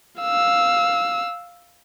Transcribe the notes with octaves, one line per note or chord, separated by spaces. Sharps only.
F5 E6